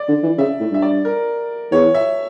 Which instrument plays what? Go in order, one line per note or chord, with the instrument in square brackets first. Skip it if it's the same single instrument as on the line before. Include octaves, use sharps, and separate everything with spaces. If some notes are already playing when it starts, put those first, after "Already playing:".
Already playing: [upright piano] D5
[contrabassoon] D3
E3
[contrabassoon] C#3 [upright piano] E5
[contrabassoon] A2
[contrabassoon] G2 [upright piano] E5
[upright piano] D5
A#4
[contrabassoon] E2 [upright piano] C#5
[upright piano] E5